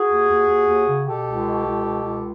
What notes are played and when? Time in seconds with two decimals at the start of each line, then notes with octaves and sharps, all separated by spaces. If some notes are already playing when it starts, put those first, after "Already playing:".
Already playing: F#4 G#4
0.10 D#2
0.29 D#2
0.49 D#2
0.68 D#2
0.87 C#3
1.07 B2 G4 A4
1.26 C#2
1.46 B2
1.65 C#2
1.84 B2
2.03 C#2